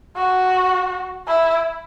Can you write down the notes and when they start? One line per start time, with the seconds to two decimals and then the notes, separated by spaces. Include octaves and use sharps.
0.16 F#4
1.27 E4